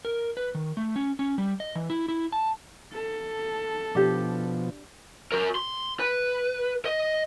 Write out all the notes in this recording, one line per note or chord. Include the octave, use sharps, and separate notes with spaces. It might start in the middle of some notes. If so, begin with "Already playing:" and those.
A#4
B4
D#3
A3
C#4
C#4
G3
D#5
E3
E4
E4
A5
A4
B2 F3 D4 G4
F#4 A#4
C6
B4
D#5